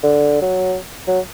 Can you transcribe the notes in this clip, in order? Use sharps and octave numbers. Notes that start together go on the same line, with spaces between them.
D3
F#3
F#3